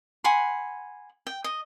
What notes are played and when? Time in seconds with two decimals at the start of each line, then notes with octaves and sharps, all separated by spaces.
0.24 F#5 G#5 B5 C6
1.27 G5
1.44 D#5